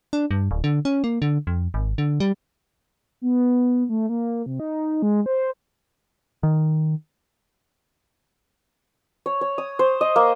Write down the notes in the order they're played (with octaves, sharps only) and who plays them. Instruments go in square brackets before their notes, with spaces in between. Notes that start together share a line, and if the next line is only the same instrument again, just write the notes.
[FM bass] D4
G2
D1
D3
C#4
A#3
D3
F2
G#1
D3
G3
[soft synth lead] B3
A3
A#3
C3
D#4
G#3
C5
[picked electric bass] D#3
[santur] C#5
C#5
D#6
C5
D#5
A#3